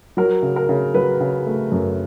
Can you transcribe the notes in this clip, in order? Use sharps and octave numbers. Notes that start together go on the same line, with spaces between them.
F#3 A#4
C#3
A#4
C#3
F#3 B4
C#3
A3
F#2